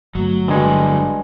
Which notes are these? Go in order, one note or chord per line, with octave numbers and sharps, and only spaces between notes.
G1 F#3 A3
G2 D3 F#3 G#3